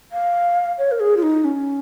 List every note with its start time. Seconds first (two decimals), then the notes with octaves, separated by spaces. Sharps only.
0.12 F5
0.78 C#5
0.92 A#4
1.00 G#4
1.17 F4
1.23 D#4
1.45 C#4